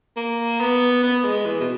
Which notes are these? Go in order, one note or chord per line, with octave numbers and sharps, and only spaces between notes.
A#3
B3
B3
G#3
E3
B2